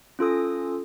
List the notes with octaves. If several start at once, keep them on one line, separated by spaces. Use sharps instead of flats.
C#4 F4 A4 D#6